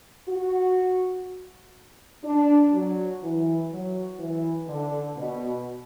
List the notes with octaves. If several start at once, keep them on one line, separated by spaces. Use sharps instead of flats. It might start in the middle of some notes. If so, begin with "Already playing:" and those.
F#4
D4
F#3
E3
F#3
E3
D3
B2